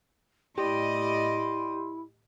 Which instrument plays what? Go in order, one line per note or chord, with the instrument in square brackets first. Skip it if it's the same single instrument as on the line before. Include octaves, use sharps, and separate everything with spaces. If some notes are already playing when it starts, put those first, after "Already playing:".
[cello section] A2 D5 D#5 [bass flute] E4 [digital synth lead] G4 [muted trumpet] C6